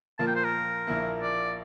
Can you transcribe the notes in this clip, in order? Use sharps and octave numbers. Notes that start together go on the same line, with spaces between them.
A#2 F3 A#3 F4 A#4 A5
G5
C5
A#4
A#1 A#2 F3 A#3 E4
D5